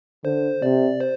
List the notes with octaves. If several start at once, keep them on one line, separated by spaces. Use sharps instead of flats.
D3 C5
C3 D5
C5